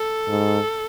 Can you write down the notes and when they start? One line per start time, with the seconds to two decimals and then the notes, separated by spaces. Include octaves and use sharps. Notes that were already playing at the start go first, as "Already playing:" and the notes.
Already playing: A4
0.28 G#2